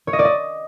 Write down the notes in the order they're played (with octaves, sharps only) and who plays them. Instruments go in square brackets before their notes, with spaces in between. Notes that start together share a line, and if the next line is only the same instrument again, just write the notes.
[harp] C#5
D#5
D5
D#5